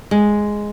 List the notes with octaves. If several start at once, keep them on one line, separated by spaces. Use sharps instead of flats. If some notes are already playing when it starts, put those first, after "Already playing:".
G#3